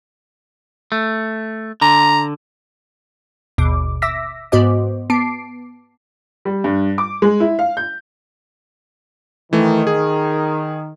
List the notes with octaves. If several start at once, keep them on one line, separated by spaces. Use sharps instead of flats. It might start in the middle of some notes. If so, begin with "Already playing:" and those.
A3
D3 A#5
G#1 D#2 B2 D6
E5 D6 E6 A#6 B6
G#2 B3 F#4 C5 D#5 D6
B3 A5 D6 C7 D7
G3
G2
D6
G#3
E4
F5
G6
D#3 E3 A3
G#4